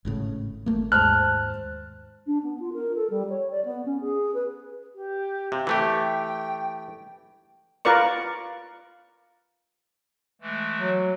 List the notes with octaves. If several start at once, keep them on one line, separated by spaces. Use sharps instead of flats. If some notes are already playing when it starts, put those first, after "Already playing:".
G#1 A2 C#3
G1 A3 A#3
D#2 G#2 C5 A5 F6 F#6
D4
B3
F4
A#4
A4
G3
C#5
D5
B3
C#4
G#4
B4
G4
C3 F5
E3 A3 G4 G5
F4 A#4 B4 D5 C#6
E3 G#3 A3
F#3